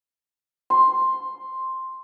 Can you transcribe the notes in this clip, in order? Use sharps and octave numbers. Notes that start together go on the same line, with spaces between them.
C6